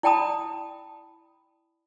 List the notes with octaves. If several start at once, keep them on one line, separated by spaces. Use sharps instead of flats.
E4 D5 G5 A5 B5 D#6